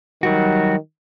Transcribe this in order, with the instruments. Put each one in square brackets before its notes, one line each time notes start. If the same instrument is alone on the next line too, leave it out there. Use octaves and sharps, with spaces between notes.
[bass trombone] D#3 [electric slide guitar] F#3 G3 F#4